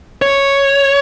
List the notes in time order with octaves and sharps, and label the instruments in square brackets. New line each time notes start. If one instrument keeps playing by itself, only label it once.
[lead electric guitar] C#5